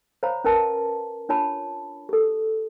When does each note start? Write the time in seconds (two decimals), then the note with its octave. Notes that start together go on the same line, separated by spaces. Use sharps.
0.23 C5 C#5 F5 A#5 B5
0.44 C#4 A#4 B4 A5
1.29 D4 F4 C#5 A5 B5
2.09 G4 A4